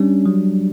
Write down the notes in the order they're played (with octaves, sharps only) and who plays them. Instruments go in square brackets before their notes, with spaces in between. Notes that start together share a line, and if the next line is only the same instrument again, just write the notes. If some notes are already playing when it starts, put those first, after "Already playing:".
Already playing: [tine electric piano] G3 C#4 D4
F#3